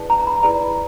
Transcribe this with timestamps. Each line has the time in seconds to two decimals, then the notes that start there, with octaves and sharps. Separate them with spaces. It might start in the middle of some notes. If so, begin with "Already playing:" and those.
Already playing: E4 G#4 B4 D5 A5
0.10 A#5
0.27 B5
0.43 E4 G#4 B4 D5 A#5